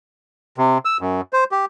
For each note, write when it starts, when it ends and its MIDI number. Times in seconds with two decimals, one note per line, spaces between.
0.58 0.78 48
0.85 0.97 88
1.01 1.21 42
1.33 1.44 72
1.52 1.65 67